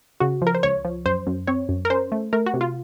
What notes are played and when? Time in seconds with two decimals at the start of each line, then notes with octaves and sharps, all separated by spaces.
0.20 C#3 F#4
0.42 F3 A#4
0.55 C5
0.63 C#2 C#5
0.85 F3
1.06 F#2 C5
1.27 F#2
1.47 C4 C#5
1.69 F#2
1.85 A#4
1.90 C#4 C5
2.12 A3
2.33 A3 A#4
2.46 F#4
2.54 C3
2.61 F4